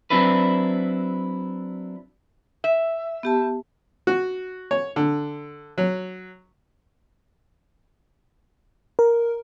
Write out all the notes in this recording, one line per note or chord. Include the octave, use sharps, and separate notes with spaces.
F#3 C4 D4 E4 B4
E5
B3 G4 A5
F#4
C#5
D3
F#3
A#4